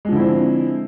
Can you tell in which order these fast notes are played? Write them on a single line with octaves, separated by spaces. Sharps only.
G#3 F3 D3 E4 C4